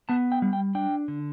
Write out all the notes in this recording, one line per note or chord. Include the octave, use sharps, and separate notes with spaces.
B3 A5
G5
G3
G5
D4 G5
D3